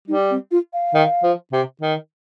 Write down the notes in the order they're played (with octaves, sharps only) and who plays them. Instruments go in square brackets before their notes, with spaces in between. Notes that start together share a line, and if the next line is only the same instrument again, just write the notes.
[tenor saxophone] G3 [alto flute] D#4
[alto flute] C4
F4
F5
[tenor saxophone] D#3
F3
C3
D#3